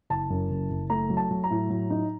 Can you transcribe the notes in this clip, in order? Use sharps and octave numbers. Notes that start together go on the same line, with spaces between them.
F#1 A5
F#2
F#1
F#1
A3 A#5
F#3
A5
F#3
A#5
A2
F#3
D#4